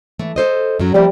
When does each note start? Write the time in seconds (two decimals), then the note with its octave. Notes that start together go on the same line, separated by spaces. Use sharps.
0.19 E3 A3
0.36 A4 C5 D#5
0.79 F#2 F#3
0.94 F3 G3 A3 A#3